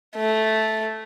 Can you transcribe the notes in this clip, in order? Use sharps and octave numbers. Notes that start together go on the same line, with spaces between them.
A3